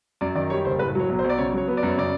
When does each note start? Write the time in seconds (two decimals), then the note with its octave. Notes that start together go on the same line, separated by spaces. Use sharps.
0.21 F#2 D5
0.35 D#3 D5
0.50 G3 C#5
0.65 F#1 C5
0.79 A2 B4
0.95 F#3 C#5
1.09 B1
1.19 C5
1.24 B1
1.29 D5
1.38 C#3 C#5
1.53 F#3 C#5
1.68 B3
1.77 D5
1.83 F#2
1.88 C#5
1.98 C#3 D5